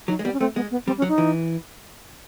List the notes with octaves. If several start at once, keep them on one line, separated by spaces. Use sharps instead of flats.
F#3 D#4
G#3
G3 B3
C#4
A3 C4
G#3 B3
B3
G3 C4
C#4
F#3
D#4
E3